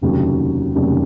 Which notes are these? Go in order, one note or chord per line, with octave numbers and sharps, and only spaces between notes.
F1 D#2 C#3 F#3
F1 D#2 C#3 F#3